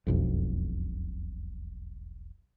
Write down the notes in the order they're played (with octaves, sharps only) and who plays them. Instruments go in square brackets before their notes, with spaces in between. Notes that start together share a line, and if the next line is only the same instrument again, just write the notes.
[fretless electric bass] E1 B1 F2